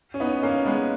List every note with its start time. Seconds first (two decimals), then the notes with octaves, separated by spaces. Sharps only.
0.14 C#4
0.20 B3 D#4
0.43 A#3 C#4
0.65 G#3 B3